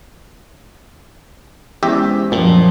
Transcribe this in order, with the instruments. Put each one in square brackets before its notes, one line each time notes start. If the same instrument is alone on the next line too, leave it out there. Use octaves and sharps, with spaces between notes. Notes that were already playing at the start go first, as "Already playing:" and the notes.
[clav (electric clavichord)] E2 G4 E5 [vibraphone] G#3 C#4 C5
[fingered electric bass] F#2 A#2 [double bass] F3 [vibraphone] C#4 A#4